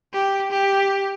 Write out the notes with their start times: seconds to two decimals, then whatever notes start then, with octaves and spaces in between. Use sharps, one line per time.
0.14 G4
0.51 G4